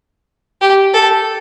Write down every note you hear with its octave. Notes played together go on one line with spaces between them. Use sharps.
G4
A4